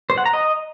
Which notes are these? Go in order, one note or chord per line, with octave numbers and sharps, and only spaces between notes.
C5
F#5
A#5
D#5